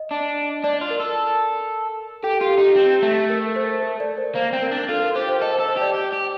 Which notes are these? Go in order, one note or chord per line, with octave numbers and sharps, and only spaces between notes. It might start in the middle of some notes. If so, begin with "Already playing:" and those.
Already playing: D#5
D4
D4 D5
F4
A#4
A4
G4 A4
F4 G4
D#4 G4
C4
A3
A#4
C5
A#4
D5
C5
A#3 C5
C4
A#4
D4
F4 A4
A#4
G4 C5
C5
A4 D#5
A4 C5
C5
G4
D5
G4
G4